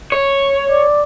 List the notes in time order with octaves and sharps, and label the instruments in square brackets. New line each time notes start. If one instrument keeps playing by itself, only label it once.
[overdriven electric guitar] C#5
[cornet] D5